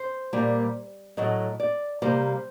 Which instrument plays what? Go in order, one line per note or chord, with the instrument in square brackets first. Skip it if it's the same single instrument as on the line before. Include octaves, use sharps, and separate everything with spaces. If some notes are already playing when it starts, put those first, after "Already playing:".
Already playing: [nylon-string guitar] C5
A#2 G3 A#3
A2 F#3 A3 D#5
D5
C3 G3 A#3 C5